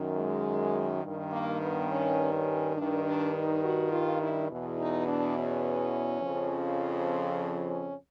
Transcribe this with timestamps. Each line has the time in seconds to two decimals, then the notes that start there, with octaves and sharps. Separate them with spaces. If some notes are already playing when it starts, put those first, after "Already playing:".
Already playing: F#2 D#3
0.17 G#3
1.03 G2 D#3
1.32 A#3
1.60 B3
1.90 C#4
2.33 C#4
2.76 G2 D#3 D4
3.04 D4
3.33 D#4
3.63 F#4
3.91 F4
4.21 E4
4.50 E2 B2
4.78 D#4
5.07 D4
5.36 C#4
6.22 F2 C#3 F3
7.09 C4
7.68 C#4